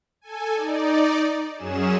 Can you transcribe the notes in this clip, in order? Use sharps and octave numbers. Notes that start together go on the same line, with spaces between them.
A4 G#5
D#4 D5
F#2 F#3 C#4 G#4 E7